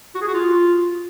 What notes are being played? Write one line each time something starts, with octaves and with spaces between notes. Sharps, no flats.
F#4
G#4
F#4
F4